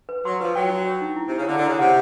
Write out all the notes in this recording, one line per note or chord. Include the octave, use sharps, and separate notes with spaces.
B4
F#3 C6
F3 B4
F#3 G5
F#4
C#5
D#4
E4
C3
C#3 E4
D3 E4
D3
C#3 E4
C3 F#5